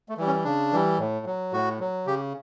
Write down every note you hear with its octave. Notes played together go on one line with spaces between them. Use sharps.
A3
E3 G3
C#4
C#3 D4
E3 G3
A2
F#3
A2 F#4
F#3
C#3 G4